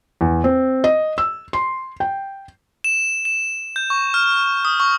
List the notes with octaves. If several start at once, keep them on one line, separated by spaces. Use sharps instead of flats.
E2
C4
D#5
E6
C6
G5
E7
E7
G6
C#6
F6
D#6
C#6